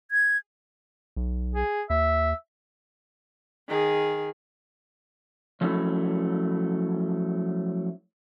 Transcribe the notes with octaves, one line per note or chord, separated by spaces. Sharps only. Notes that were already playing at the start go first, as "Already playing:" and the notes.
G#6
B1
G#4
D#2 E5
D#3 G#4
F3 F#3 A3 C#4 D#4 E4